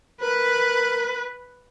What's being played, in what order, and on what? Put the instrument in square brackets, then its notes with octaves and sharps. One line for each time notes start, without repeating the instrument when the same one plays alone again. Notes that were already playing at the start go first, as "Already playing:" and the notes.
[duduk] A#4 [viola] B4